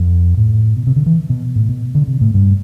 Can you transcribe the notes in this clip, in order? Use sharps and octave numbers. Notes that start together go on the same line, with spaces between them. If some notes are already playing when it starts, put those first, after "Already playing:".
Already playing: F2
A2
B2
C3
D3
E3
B2
A2
B2
D3
C3
A2
G2